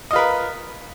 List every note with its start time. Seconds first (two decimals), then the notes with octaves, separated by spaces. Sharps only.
0.11 D#5
0.13 F4
0.16 B4
0.18 A#4